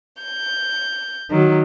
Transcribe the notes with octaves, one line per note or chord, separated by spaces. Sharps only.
G6
D#3 F#3